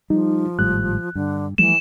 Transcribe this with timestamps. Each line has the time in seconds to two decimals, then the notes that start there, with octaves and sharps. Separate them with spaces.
0.10 F3 G3 D#4
0.59 G#1 A2 G3 F#6
1.15 G2 D3
1.58 E3 F3 G3 A3 E7